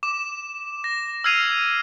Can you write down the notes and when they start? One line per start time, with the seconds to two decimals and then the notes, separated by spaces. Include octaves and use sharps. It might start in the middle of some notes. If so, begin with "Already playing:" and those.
0.03 D6 E7
0.84 A#6
1.24 E6 F6 G#6 C7 D#7 F7